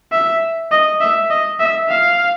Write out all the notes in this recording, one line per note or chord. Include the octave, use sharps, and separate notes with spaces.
E5
D#5
E5
D#5
E5
F5